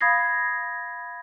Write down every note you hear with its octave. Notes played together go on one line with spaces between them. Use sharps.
F5 B5 D#6 G#6 A#6 C7